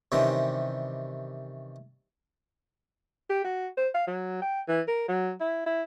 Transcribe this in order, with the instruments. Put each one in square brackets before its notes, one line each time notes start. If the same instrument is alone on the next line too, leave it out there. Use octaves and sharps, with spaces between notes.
[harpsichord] C3 D#3 E3 G3 C4 C#4
[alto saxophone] G4
F#4
C5
F5
F#3
G5
E3
A#4
F#3
E4
E4